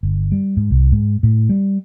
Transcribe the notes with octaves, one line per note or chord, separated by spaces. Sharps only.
G1
G3
G#2
C2
G#2
A2
G3